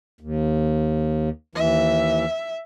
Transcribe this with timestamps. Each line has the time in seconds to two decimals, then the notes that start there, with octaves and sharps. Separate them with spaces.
0.21 D#2
1.55 D#2 E3 E5